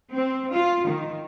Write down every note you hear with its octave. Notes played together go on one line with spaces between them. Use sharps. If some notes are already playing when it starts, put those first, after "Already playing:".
C4
F4
D#3